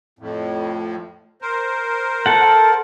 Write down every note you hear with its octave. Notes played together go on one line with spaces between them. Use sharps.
F2 A2
A#4 C5
A4 F#5